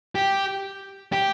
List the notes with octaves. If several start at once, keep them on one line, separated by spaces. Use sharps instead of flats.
G4
G4